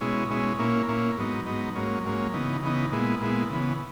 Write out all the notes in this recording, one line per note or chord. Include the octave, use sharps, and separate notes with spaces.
B2 G#3 C#4 E4
B2 G#3 C#4 E4
A#2 A#3 C#4 E4
A#2 A#3 C#4 E4
G#2 F#3 B3 D#4
G#2 F#3 B3 D#4
G#2 F#3 A#3 C#4
G#2 F#3 A#3 C#4
C#3 E3 B3 D#4
C#3 E3 B3 D#4
A#2 G#3 B3 E4
A#2 G#3 B3 E4
C#3 E3 B3